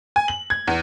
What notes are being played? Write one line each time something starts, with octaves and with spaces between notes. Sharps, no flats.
G#5
F#7
G#6
E2